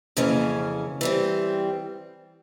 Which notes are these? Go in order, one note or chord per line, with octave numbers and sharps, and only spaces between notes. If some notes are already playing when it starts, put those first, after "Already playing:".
F2 C#3 E3 A#3 C#4
E3 G3 C4